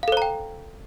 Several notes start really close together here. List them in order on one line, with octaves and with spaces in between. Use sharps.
F5 A4 C5 A#5 G5